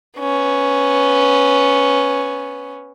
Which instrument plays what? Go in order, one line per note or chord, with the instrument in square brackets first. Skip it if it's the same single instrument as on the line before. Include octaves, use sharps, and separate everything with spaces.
[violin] B3 C#4